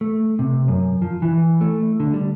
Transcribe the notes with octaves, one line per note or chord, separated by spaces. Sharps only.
A3
C3
F#2
F3
E3
A3
D3
G3